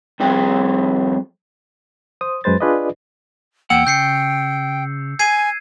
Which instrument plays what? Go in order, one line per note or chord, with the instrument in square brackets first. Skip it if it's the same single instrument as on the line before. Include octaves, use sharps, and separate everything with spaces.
[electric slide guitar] F2 G3 C4 G#4 G5
[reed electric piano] C5 D#6
F#2 G#3 B4 C5 A6
D4 F4 G#4 B4 D5 D#5
[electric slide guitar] E2 A#3 F#5 [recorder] G5 [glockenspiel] E6
[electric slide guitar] C#3 [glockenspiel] G6 C7 C#7
[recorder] G#5 [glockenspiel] G#6 C7 D#7